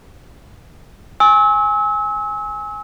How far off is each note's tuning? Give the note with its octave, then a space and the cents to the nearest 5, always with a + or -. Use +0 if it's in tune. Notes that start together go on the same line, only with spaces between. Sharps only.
G#5 +0 C#6 -35 E6 -35